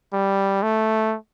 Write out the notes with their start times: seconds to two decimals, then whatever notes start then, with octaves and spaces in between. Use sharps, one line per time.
0.13 G3
0.63 A3